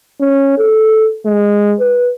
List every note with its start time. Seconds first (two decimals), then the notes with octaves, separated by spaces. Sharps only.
0.21 C#4
0.58 A4
1.26 G#3
1.80 B4